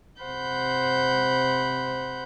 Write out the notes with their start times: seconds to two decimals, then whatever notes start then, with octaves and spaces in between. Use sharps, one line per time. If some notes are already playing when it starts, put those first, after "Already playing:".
0.22 C3 C5 F#5 B5 G6